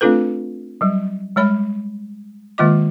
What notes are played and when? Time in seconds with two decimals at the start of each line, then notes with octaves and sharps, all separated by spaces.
0.01 A3 C4 D4 F4 A4 B4
0.81 F#3 G3
1.36 G3 G#3 C#5 B5
2.58 D#3 G#3 A#3 F4 D#5 D6